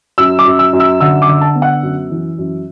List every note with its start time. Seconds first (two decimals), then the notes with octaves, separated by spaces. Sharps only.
0.18 F#2 E6
0.39 D6
0.46 F#2
0.59 E6
0.73 F#2
0.80 E6
1.00 D3 E6
1.22 D6
1.28 D3
1.41 A5
1.55 B3
1.62 F#5
1.83 F#2
2.11 E3
2.38 F#2